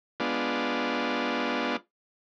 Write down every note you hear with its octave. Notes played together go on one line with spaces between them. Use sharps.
G#3 B3 D4 F4